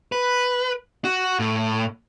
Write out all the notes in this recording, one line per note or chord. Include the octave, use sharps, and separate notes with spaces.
B4
F#4
A2